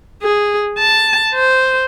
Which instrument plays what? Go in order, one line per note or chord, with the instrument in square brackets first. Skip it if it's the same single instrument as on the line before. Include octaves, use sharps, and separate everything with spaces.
[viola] G#4
A5
C5